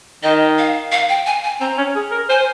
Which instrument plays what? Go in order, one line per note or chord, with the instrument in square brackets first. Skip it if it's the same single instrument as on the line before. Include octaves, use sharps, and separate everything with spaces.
[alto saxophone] D#3 [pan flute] D#5
[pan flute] F5
F5
G5
G#5
G#5
[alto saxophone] C4 [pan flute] A#5
[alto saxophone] C#4
G#4
A#4
[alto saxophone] C5 [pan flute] G#5